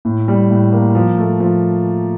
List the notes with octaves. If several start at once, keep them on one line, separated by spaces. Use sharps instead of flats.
A2
G3
A2
A#3
F3
A3
F3